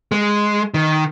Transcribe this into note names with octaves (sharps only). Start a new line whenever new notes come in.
G#3
D#3